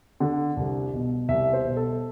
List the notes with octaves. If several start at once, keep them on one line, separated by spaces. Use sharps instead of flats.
D3
C2
B2
C2 E5
C5
B2
A4